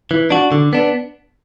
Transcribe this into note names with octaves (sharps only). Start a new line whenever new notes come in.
E3
D4 F#4
D3
B3 D4